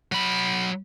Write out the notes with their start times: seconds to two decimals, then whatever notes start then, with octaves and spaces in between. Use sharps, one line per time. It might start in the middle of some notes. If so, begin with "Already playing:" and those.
0.12 F#3 B5